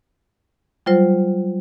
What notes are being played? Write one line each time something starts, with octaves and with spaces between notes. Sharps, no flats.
F#3 G3 F4 C5